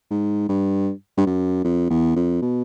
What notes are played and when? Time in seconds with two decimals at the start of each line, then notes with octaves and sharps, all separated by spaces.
0.10 G#2
0.49 G2
1.17 G2
1.26 F#2
1.64 F2
1.90 E2
2.16 F2
2.42 B2